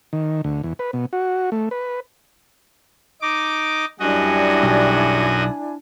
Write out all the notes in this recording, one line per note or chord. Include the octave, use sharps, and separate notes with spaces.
D#3
D2
E2
B4
B2
F#4
A3
B4
D#4 D6
F#2 G3 D4 E4 F#4 D#5 G#5
B1